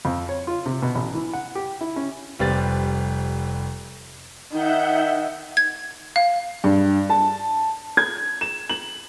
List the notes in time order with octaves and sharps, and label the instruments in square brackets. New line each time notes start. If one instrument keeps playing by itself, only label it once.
[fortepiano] F2
C#5
F4
C3
B2
A1
E3
F#5
G4
E4
C#4
[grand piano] F1 G3 C4 B4 A6
[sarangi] D#3 [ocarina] D#4 [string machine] E5 F#5 G6
[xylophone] G#6
F5
[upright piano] G2
A5
G#6
E7
F#7